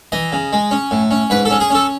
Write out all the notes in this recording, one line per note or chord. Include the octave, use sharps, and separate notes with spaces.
E3 D#5
C#3
G#3
C#4
A2
C#4
G#2 B4
A4
C#4
G#4
C#4 A4